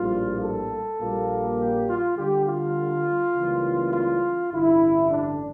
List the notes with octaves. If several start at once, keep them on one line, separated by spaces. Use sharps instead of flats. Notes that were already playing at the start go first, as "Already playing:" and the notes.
Already playing: A#1 A2 G3 A#3 F4
A4
A#1 A#2 G3 A#3
G4
F4
D2 D3 G3 G4
F4
C#2 C#3 E3 G3 A#3
F4
A1 G2 D3 E4
D4